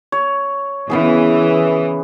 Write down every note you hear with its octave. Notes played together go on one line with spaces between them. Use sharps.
C#5
C#3 E3 B3 G#4